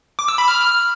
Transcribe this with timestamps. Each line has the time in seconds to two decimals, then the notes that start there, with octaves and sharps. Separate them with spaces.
0.19 D6
0.28 E6
0.38 B5
0.48 F6